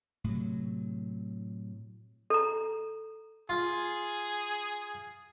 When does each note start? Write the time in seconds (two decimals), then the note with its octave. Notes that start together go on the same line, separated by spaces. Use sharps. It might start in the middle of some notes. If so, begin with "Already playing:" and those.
0.24 A2 C3 F#3
2.30 A4 A#5
3.49 F4 G#4